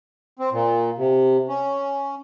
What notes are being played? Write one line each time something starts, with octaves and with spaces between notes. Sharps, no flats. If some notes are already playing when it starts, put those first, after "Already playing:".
C4
A#2
C3
C#4